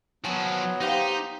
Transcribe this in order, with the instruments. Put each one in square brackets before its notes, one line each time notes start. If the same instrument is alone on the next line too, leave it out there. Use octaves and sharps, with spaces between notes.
[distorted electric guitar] F3 F#4 [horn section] F#3 [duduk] B3 [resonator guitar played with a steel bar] G#5 A5
[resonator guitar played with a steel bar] A#3 F5 [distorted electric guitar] D#4 [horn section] G4 C5